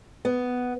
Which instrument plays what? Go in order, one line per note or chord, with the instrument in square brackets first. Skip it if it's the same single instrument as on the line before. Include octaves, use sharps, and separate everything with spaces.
[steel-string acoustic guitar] B3